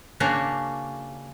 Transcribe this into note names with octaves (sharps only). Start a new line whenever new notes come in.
C#3 A#3 C#4 D4 F#4